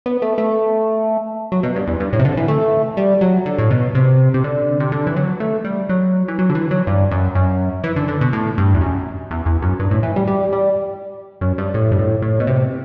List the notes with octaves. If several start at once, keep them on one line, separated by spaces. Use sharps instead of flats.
B3
A3
A3
F#3
B2
G2
E2
G2
A2
C3
D3
E3
A3
G3
F#3
D3
A2
B2
C3
C3
D3
C3
D3
E3
F#3
A3
G3
F#3
E3
F#3
D3
E3
F#3
G2
F#2
F#2
E3
D3
D3
B2
A2
G2
E2
F#2
E2
E2
F#2
G2
A2
E3
G3
G3
G3
F#2
G2
A2
G2
A2
A2
B2
C3